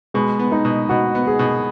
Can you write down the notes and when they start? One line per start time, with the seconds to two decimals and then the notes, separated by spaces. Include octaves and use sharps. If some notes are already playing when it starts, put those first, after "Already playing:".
0.14 B2 G#3
0.39 B3
0.52 D#4
0.65 B2
0.89 B2 F#4
1.15 B3
1.27 G#4
1.39 B2